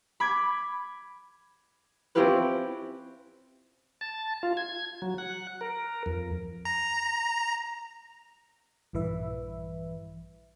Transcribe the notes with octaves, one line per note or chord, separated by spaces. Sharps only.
B5 D6 G#6
C4 C#4 E4 F4 G4 B4
A5
F4
G#6
F#3
F#5
A#4
F2
A#5
A#1 G2 E3 B4 E5